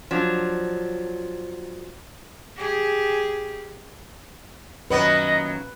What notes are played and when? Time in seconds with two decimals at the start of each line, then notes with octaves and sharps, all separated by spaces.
0.11 F3 F#3 D4
2.57 G4 G#4
4.90 F#2 A#2 D#3 F#3 B3 B4 D#5